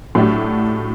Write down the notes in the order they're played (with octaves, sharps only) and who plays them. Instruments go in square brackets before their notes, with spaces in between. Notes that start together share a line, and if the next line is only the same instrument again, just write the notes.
[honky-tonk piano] A2 F#3 A3 D4 G4